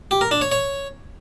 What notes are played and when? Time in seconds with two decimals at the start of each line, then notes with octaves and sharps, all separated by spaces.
0.11 G4
0.21 A#4
0.31 D4
0.41 C#5
0.52 C#5